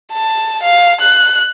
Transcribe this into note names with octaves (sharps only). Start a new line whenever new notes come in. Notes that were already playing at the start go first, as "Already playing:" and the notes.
A5
F5
F#6